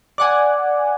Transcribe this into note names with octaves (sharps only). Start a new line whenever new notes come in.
D5 F#5 G#5